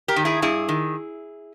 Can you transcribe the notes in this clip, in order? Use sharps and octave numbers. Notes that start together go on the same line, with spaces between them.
G4 A#4
D#3
E4 G#4
G2 E4 G#4
D#3